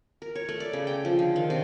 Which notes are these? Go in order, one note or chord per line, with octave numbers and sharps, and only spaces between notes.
A#4
C#5
A3
D5
C#3
G5
F3
D3
D#3
C3